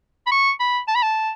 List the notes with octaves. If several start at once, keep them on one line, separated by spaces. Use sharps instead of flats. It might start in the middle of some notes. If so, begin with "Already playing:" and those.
B5
C#6
B5
A5
B5
A5